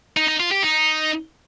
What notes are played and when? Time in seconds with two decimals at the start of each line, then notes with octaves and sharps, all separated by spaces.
0.17 D#4
0.28 D#4
0.40 F4
0.51 G4
0.63 D#4